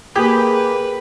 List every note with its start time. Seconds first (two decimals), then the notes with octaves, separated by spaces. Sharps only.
0.16 A#3 G4 G#4 B4